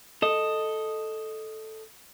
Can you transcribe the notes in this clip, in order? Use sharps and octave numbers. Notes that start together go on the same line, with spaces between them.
A4 D#5